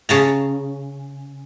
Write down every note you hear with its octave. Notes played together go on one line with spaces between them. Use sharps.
C#3 A5 A#5